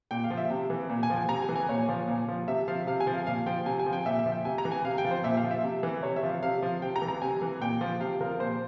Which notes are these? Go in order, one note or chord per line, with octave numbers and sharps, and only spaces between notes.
A#2 G5
F5
F3
E5
C3
E3
A#2
G#5
F3 G5
G#5
C3 A#5
G#5
E3
G#5
A#2 C#5
F3
A#2
F3
C3 E5
F3 F5
C3 F5
G#5
F3
F5
A#2 F5
F3 G5
C3 G#5
G#5
F3
G5
A#2 E5
E5
F3
G5
C3 G#5
A#5
E3
G#5
C3 F5
G5
F3
C5
A#2 E5
F5
F3
E5
C3
E3
C3 C#5
E5
F3
F5
C3 F5
F3
C3 G5
A#5
E3
A#5
C3 G#5
E3
A#2 G5
F3
C3 F5
F3 A#4
A#2 C5